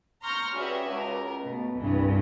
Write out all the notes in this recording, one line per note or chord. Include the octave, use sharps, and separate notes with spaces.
A#5 C6 C#6 F6 G6 A#6
G3 C#4 F#4 G#4 B4 E5
C#2 A#4
B2 A3
C2 G2 E3